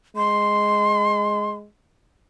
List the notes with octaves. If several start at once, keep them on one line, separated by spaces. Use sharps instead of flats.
G#3 C6